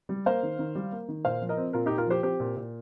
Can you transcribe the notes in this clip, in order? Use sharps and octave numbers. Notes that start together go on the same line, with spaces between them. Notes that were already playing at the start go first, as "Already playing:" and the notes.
G3
A#3 C5 F5
D#3
D#3
G3
A#3
D#3
A#2 C5 F5
F3
A#4 D#5
C4
A#2 F4 A#4
A#2 D#4 G4
F4 A#4
F3 G4 C5
C4 G4 C5
A#2
A#2